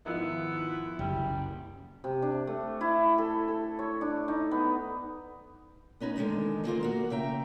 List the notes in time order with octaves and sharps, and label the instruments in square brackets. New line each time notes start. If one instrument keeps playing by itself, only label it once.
[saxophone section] G#2 E4 [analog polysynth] D#3 F3 F4 [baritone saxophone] B3
[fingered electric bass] F#1 [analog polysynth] C2 F#2 [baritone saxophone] G3
[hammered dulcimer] C3
D4
A3
E4
A4
A4
C#5
D4
D#4
B3
[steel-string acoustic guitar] B3 C#4 D#4 B4
D3 D#3 G#3 A3 D#4
D#3 A#3 F4 C5
E2 A#3 F#4
C#3 E5 G5 A#5